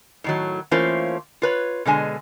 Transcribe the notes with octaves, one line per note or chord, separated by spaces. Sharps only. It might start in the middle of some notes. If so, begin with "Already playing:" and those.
A2 D#3 F#3
E3 A3 A#3 C#4 F4 C5
F4 B4 C#5
B2 D3 G#3 G#5